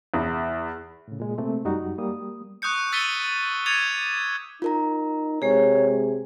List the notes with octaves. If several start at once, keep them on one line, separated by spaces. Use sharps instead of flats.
E2
A2 C#3
A#2 G#3
C3 A3 A#3 C4
F#2 G3 D#4 F#4
G3 A#3 D#6
C#6 D#6 F#6 G6 C#7
E6 A6 B6 C#7 D#7 G7
D6 G#6 A6 C#7 D#7 F7
D#4 F4 A#4 A#5
C3 G#3 G#4 C#5